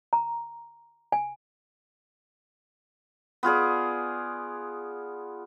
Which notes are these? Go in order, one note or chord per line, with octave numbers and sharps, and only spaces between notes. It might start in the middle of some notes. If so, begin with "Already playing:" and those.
A#5
G#5
B3 F4 G#4 D5